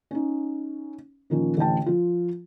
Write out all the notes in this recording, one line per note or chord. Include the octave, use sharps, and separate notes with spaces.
C#4 D#4
A#2 D#3 F3 C#4
A1 D2 A2 G5 A5
F3 F4